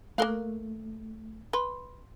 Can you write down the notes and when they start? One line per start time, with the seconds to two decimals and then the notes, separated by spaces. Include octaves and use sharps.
0.18 A3 A#3 A4 A#4 F5 F#6 G7
1.53 B4 C6 G7